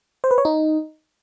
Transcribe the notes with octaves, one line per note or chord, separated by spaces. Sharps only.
C5
B4
C#5
D#4